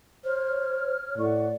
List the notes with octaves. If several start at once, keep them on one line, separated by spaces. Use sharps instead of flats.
C5 C#5 F6
A2 D5 F#5 C#6